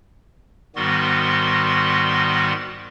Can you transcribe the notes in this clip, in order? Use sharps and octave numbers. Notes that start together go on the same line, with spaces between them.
G#2 D#3 G3 B3 F#4 C6